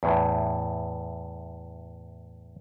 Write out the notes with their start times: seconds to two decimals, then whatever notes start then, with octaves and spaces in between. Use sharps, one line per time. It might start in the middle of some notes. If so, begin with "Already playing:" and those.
0.03 E2 A2